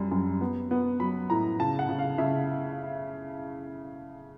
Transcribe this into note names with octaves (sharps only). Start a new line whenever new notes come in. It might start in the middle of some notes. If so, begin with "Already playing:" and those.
Already playing: F#2 G3
F#2
B3
B3
F#3 B5
A2 A#5
C#3 A5
F#5
C#3
F5
C#3 E5